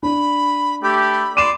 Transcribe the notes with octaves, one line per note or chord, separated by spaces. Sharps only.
D4 B5
A3 G4 B5
D5 C6 D#7 E7